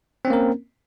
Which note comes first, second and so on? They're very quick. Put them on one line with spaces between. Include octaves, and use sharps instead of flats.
C4 C#4 A#3 A#4